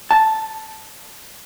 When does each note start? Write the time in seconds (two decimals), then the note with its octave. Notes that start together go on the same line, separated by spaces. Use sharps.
0.11 A5